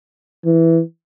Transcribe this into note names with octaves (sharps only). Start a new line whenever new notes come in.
E3